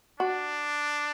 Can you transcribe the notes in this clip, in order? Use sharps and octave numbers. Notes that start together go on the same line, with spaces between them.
D4 F#4